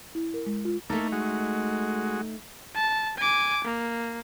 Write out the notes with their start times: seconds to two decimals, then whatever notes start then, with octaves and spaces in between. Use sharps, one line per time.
0.15 E4
0.34 A#4
0.46 G#3
0.65 F4
0.90 A3 A#3 D#4 A4
1.12 G#3 F#4
2.75 A5
3.18 G#5 D6
3.64 A#3